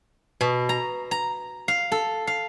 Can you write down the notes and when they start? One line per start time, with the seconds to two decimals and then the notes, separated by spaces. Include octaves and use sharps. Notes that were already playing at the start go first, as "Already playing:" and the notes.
0.41 B2
0.69 A#5
1.11 A#5
1.68 F5
1.92 A4
2.27 F5